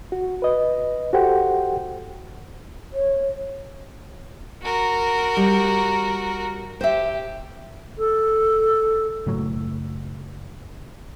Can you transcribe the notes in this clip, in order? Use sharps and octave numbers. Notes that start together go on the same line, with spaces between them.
F#4
B4 D#5
F#4 G4 A4 C5 F#5 G5
C#5
F#4 A#4
G3
G4 C5 E5
A4
F#1 A2 F#3